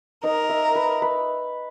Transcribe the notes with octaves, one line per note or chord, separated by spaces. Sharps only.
D#4 A#4
E5
B4
B4